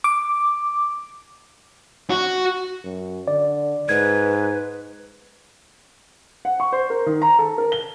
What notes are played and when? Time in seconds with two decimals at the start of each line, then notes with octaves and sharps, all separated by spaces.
0.04 D6
2.10 F#4
2.84 F#2
3.28 D3 D5
3.89 G#2 B4 G#6
6.45 F#5
6.60 C#6
6.72 C5
6.90 A#4
7.06 D#3
7.22 A#5
7.39 A4
7.58 A#4
7.72 G7